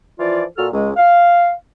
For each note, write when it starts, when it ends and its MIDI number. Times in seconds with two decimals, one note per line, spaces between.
0.19 0.44 52
0.19 0.44 53
0.19 0.44 65
0.19 0.44 74
0.58 0.67 46
0.58 0.67 66
0.58 0.67 69
0.58 0.67 89
0.73 0.91 37
0.73 0.91 56
0.97 1.53 77